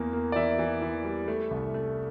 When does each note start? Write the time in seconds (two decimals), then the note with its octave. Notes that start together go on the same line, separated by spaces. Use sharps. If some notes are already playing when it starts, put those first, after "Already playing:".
Already playing: E2 E3 A#3
0.13 A#3
0.32 D5
0.36 E3 E5
0.59 E3
0.82 E3
1.04 G3
1.28 A3
1.51 C2
1.74 A3